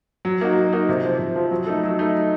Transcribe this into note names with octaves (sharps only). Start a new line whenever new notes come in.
F#3
A#3 D#4 F#4
F#3
A#3 D#4 F#4
C3
F3 C4
C3
F3 C4
F#3
A3 D#4 A4
F#3
A3 D#4 A4